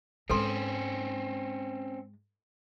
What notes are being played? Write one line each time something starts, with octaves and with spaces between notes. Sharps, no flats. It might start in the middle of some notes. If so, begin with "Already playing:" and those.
G#2 G#3 C4 C#4 A4 B4 C6